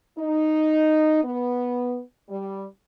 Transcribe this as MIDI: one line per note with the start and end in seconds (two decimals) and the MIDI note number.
0.19 1.20 63
1.23 2.00 59
2.29 2.64 55